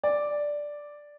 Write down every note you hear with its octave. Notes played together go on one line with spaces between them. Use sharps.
D5